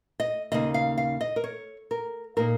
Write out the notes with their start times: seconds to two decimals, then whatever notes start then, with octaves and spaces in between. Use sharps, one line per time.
0.20 D#5
0.52 D#2 C#3 A#3 D#4 D#5
0.74 F5
0.98 F5
1.21 D#5
1.36 A#4
1.44 C#5
1.91 A#4
2.37 A#2 A#3 D#4 A#4